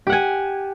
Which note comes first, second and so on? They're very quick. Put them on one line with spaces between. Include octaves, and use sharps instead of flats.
G4 F#5 G#5